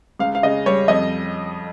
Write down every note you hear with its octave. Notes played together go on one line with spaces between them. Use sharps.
C#2 F5
F5
C#3 D#5
G3 C#5
F2 D#5